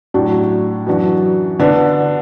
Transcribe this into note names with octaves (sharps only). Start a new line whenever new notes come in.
A2 F#3 D4 F#4
F#2 E3 D4 F#4
D3 B3 D4